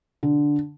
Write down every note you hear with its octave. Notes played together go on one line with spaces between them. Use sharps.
D3